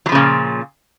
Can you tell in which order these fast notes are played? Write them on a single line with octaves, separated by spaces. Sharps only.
F#3 F3 C#3 A#2